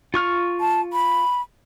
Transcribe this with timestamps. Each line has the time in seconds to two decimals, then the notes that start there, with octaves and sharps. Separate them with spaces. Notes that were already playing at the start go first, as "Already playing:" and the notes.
0.14 F4 C#6 F6
0.60 A5
0.93 B5